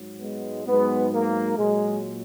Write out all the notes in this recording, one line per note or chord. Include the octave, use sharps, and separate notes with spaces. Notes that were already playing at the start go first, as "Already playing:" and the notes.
Already playing: G#2 F#3
G#3 B3
G#2 F#3 G#3 B3
A#3
A#2 F#3 G#3